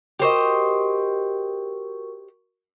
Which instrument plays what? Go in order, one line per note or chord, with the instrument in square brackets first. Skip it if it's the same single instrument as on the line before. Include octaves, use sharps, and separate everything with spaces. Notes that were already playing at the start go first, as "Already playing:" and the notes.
[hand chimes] F#4 A#4 C#6 [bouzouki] G4 C5 D#5